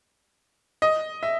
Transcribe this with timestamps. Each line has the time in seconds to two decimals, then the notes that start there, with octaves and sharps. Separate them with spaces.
0.82 D#5
1.23 E5